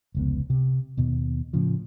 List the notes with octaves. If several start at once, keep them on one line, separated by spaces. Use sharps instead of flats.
F1 C#2 B3
C3
D#2 B2
A2 C#3 F3